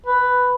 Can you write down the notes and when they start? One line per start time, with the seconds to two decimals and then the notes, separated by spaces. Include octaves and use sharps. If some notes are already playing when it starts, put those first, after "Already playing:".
0.06 B4